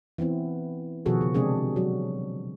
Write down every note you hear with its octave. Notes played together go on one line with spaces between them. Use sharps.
E3 B3 C4 E4
B2 D#3 F3 F#4 G#4 A4
C#3
C3 G#3 C4 D4 G#4
F#3 F#4